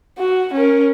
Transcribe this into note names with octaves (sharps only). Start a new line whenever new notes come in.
F#4
C#4 A#4